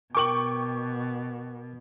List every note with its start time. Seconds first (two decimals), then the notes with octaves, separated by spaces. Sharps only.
0.15 B2 A#4 G5 C#6 D6 F#7